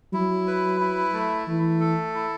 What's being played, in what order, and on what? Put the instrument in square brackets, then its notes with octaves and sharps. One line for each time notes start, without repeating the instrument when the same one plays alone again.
[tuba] F#3 [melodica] E4
[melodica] B4
E4
A3
[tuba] E3 [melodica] A3
[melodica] A4
E4